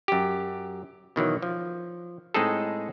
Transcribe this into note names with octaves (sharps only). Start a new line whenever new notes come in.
F#2 G4
B2 D#3 E3 F#3
F3
A2 G#3 C4 D#4 G#4 A4